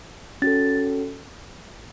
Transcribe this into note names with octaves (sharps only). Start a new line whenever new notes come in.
C#4 F#4 A4 A6